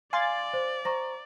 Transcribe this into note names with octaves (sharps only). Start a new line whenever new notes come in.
D5 F5 G#5 C6 F6 A6
C5
C5 A#5 C#6 A#6